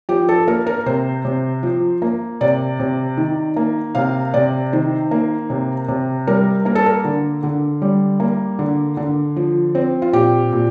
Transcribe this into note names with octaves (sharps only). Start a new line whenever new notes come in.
F3 G4
A4
A#3 A#4
A#4
C3 C5
C3
F3
A#3
C3 D5
C3
D#3
A#3
C3 F5
C3 D5
D#3 C5
A#3
C3
C3
G3 A#4
A#3 A#4
A4
A#4
D3
D3
G3
A#3
D3
D3
F3
C4
F4
A#2 G4
A#2